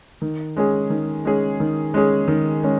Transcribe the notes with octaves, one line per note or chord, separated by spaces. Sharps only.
D#3
G#3 C#4 G#4
D#3
G#3 C#4 G#4
D#3
G#3 C#4 G#4
D#3
G#3 C#4